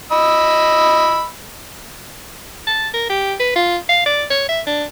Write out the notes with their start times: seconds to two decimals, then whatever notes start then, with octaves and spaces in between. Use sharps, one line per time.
0.12 D#5 B5 E6
2.67 A5
2.93 A#4
3.09 G4
3.40 B4
3.55 F4
3.89 F5
4.06 D5
4.30 C#5
4.49 E5
4.67 D4